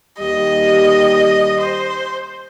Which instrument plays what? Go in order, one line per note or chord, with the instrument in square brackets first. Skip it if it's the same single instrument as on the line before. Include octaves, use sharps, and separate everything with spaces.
[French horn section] D#2 G3 G4 [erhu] D#5
[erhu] C5